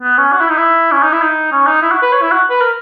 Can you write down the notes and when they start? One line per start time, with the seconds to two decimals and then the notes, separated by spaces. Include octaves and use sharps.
0.03 B3
0.18 C#4
0.32 F#4
0.41 E4
0.49 D#4
0.58 E4
0.92 C#4
1.03 D#4
1.13 E4
1.22 D#4
1.52 C#4
1.67 D#4
1.82 E4
1.92 F#4
2.02 B4
2.12 C#5
2.21 E4
2.32 F#4
2.50 B4
2.61 A#4